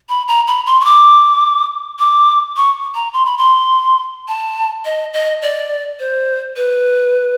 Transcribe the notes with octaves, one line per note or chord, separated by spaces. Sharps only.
B5
A#5
B5
C6
C#6
D6
D6
C#6
A#5
C6
B5
C6
A5
D#5
D#5
D5
C5
B4